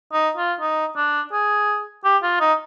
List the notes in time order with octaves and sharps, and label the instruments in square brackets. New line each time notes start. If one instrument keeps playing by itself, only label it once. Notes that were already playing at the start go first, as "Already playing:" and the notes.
[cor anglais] D#4
F4
D#4
D4
G#4
G4
F4
D#4